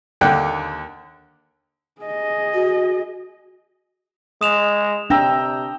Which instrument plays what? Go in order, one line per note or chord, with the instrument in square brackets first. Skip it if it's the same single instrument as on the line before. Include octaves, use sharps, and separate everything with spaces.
[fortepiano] D#2 D3 A#3 G5 F#6
[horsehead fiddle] G#4 D#5
[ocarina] F#4
[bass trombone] G#3 [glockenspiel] D#6 E7 F7
[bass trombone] C3 [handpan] D4 [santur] G5 A#5 E6